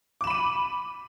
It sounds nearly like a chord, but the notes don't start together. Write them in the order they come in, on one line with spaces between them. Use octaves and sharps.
D6 E7 B5 D#7